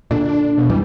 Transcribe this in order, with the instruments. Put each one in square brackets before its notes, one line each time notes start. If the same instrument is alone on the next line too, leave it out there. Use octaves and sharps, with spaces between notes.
[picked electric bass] A#2 D3 [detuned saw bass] D4
[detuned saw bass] B2
[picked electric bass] F#2 E3 [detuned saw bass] G3